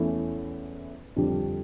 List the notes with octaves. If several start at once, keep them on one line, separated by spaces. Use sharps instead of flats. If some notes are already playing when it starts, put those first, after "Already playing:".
Already playing: E2 E3 A3 C#4 E4
F2 D3 G3 D4